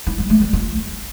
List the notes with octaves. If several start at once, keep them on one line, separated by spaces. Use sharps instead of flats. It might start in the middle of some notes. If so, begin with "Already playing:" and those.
E4
G3
A3
G3
F4